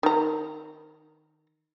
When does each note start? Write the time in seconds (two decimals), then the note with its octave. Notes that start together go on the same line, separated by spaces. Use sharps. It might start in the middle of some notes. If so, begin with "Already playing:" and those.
0.03 D#3 A#5